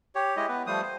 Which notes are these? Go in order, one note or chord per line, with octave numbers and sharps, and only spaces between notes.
G4 C#5
G#3 E4 G4 D#5
B3 B4
F3 G3 A3 C5 D#6
C5